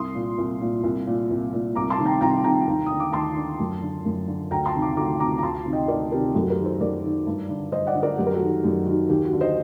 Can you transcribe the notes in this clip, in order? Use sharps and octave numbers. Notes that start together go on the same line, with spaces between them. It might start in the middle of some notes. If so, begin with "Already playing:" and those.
Already playing: C2 C6 D#6
A#2
C2
A#2
C2
A#2
C2
A#2
C2 A#5 D6
A5 C6
C3 D#3
G5 A#5
C2 G5 A#5
C3 D#3 G5 A#5
D#2
D3 D#6
D6
D#2 A5 C6
D3
F#2
D3
F#2
D3
D2 G5 A#5
A5 C6
C3 D#3
A#5 D6
D2 A#5 D6
C3 D#3 A#5 D6
A#5
D2 A5 C6
C3 D#3
D#5 G5
D2 A#4 D5
C3 D#3 G4 A#4
F#2 F#4 A4
G4 A#4
D#3
A4 C5
F#2 A#4 D5
D#3
G2
D3
G2 C5 D#5
D5 F#5
D3
A#4 D5
F#2 G4
A#4
F#4 A4
D#3
F#2 G4
D#3 F#4
D#2 G4
F#4
D3
C5 D#5